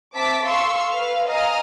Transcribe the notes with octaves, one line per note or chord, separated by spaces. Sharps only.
C4 E5 A5 D6 B6
A4 F5 C6 C#6 E6
B4 F5
D#5 F5 G#5 A#5 D#6 F6